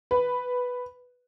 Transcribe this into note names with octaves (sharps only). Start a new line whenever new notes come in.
B4